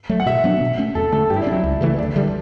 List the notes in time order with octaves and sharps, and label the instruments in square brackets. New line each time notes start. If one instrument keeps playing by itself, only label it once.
[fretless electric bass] F#3 A3
[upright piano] F#5
[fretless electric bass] B2 [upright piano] E5
[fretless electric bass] F#3 B3 D4
B2
A3 C#4
[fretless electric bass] E2 [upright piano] A4
[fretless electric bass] D3 A3 [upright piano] A4
[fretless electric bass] G2 [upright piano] G4
[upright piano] E4
D4
[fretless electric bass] C#4
[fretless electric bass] F#3 [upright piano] E4
[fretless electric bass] C#2
C#3 E3 A3
[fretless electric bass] D2 [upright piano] D4
[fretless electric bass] D3 G3